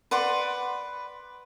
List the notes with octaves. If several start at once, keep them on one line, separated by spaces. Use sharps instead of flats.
B4 D5 F#5 C6